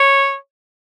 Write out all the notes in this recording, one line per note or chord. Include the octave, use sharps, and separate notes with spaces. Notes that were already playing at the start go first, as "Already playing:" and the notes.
Already playing: C#5